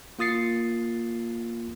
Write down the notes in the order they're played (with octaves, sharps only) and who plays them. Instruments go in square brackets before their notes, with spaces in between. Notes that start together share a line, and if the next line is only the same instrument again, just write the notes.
[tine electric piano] A#3 F4 D#6 A6 C7 C#7